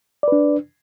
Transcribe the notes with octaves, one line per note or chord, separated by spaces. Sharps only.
D4 B4 D5